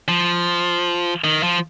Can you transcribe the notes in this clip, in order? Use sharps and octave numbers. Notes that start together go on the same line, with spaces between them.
F3
D#3
F3